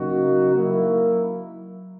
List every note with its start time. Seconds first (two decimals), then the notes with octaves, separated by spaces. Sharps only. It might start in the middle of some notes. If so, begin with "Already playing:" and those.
Already playing: C#3 F#3 A#3 D#4 F#4
0.53 F#3 A#3 E4